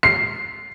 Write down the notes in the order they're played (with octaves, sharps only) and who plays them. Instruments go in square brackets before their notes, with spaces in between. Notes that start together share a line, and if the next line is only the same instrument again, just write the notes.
[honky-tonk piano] C7